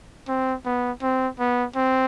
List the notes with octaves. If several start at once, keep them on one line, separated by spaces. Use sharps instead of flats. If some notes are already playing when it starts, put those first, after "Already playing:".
C4
B3
C4
B3
C4